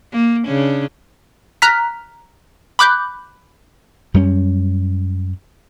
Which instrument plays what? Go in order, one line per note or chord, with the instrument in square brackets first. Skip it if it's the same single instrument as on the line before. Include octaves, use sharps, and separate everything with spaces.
[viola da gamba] A#3
C#3 C#4 D4
[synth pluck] A#5 F6 F#6 B6
B5 D6 F#6 G6
[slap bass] F#2 G3 A3 C#4